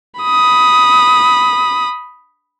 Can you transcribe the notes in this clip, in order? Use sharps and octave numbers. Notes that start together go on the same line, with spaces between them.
B5 D#6